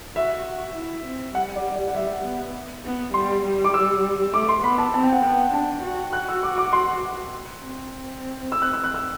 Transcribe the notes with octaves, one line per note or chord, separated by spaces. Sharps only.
F#4 E5
F#4
E4
C4
G3 F#5
D5
D5
F#5
G3 E5
B3
B3
G3 C6
G3
D6
E6
A3 D6
C6
B3 B5
A5
C4 A5
G5
F#5
B3 G5
D4 A5
F#4
F#4 F#6
E6
D6
D6
C6
C4
E6
F#6
E6
F#6
E6